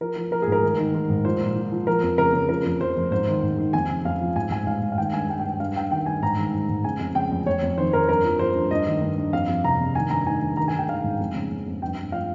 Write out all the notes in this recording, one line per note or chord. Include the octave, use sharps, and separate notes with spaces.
F3 A#4
F3
F3 A#4
G#4
G#2 A#4
D#3
D#3
D#3
G#2
F3 C5
A#2
F3
F3
F3 A#4
F2
C#3 A#4
C#3
F3 A#4
F2
F2 C5
F2
G#2 C5
D#3
G#2
D#3
F2 G#5
C#3
F2 F5
F3
G#2 G#5
G#2 G#5
G#2 F5
G#2
F5
D#3 G5
G2 G#5
G2 G5
G5
G2
G5
G2 F5
G2 G5
D#3 G5
G2 G#5
G#2 A#5
D#3
G#2
G#2
C#3 G#5
F2
C#3 G5
F2
F2 C#5
F2
D#3 C5
F2 A#4
G2 A#4
F3
F3 C5
G2
G2 D#5
D#3
G2
G2
F2 F5
F2
C3 A#5
F2
D#3 G#5
G2 A#5
D#3 G#5
G2
D#3 A#5
G#5
D#3
G5
D#3 F5
G#2
F2
C#3
C#3
F2
G2 G5
G2
F3 F5